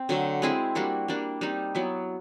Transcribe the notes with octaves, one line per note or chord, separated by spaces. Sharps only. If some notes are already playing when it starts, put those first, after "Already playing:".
Already playing: C4
D3 F#3 A3
G#3 C4 E4 G#4
G3 A#3 D4 F#4
G3 A#3 D4
G3 C4 D#4
F#3 B3 E4